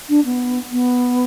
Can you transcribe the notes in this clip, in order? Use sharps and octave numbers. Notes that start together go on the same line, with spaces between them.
D4
B3
B3